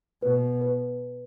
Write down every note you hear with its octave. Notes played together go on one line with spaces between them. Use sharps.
B2 B4
B4